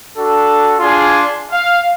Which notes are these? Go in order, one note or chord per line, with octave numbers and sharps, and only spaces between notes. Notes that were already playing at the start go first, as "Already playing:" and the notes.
D4 F#4 A4
D4 F4 G#4 C6
F5